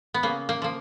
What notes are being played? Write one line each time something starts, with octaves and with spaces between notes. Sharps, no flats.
B3
C#3 A#3
A#3
F3 A#3